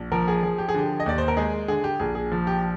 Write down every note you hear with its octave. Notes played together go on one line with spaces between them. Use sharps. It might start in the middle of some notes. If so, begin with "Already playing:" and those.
Already playing: A#1
F3 A#4
G#4
F3 G#4
G4
G#4
D3 G4
D#5
D#2 D5
C5
A#4
G#3 G#4
D3 G#4
G4
A#1 G#4
G#4
F3
G4